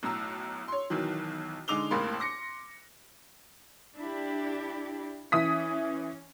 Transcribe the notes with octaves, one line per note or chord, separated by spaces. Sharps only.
B1 A2 A#5 E6
C#5 C6
B1 D#3 E3 F#3
D3 G#3 D#4 D6 F7 G7
F1 C#2 A2 A#3 B5 C6
C6 D6 A#6 C#7
D4 E4 G4
E3 C#4 D#6 B6